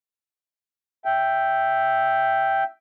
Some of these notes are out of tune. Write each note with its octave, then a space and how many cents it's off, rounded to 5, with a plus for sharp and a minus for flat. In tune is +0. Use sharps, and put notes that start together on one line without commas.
E5 +0 G5 +0